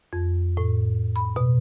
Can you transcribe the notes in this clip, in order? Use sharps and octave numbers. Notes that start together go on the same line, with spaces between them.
F2
A2
B5
B2